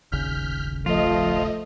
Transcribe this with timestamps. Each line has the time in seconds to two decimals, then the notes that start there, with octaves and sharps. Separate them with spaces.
0.12 D#1 G#1 C#3 F6 G6 B6
0.86 F3 A3 F4 D#5